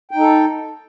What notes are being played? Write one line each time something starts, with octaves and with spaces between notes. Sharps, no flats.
D#4 A4 G5